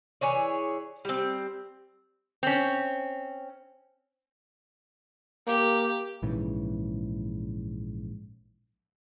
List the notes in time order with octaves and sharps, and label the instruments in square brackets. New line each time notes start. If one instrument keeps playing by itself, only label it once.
[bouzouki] E3 G#4 C#5 D5
G3 C4
[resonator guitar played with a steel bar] C4 C#4
[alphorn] A#3 [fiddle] G4
[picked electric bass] A#1 G#2 C#3 E3